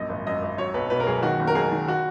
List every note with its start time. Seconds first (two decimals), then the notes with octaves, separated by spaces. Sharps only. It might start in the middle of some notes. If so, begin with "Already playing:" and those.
Already playing: A#1 F#2 D#5
0.09 G#1
0.27 F#2 D#5
0.42 G#1
0.58 F#3 C#5
0.74 B1 B4
0.90 B2 B4
1.00 A#4
1.07 B1 G#4
1.22 D#3 F#4
1.40 F#1
1.47 A#4
1.55 F#1 G#4
1.72 D#3
1.88 F#4